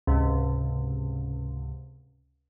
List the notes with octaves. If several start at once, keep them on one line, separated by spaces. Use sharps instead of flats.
C#2 G#2 C3